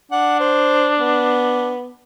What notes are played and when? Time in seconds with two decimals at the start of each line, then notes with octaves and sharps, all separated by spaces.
0.11 D4 F#5
0.40 C5
0.99 B3